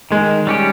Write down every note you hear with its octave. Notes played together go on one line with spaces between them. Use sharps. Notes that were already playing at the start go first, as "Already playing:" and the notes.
D#3 G#3
G3 C#4 G4